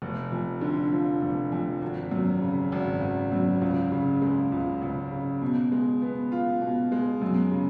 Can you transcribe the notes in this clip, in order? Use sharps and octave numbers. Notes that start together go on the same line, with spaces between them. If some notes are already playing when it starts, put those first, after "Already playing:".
F1
F2
D3
F3
F1
F2
G#1
F#2
C#3
G#1
G#1
F#2
C#2
C#3
G#3
C#2
C#2
C#3
B2
G#3
B3
F4
B2
G#3
F#2
C#3